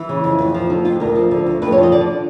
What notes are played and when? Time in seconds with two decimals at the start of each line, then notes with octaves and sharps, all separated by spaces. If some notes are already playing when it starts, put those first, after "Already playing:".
Already playing: E3
0.09 C#3
0.24 F2
0.39 F2
0.54 F3
0.70 D3 D#4
0.85 F2 F4
1.00 D2 A#4
1.15 F3
1.31 D3
1.46 D2
1.62 F2 B4
1.72 C#5
1.78 F3
1.83 D#5
1.92 D3 D5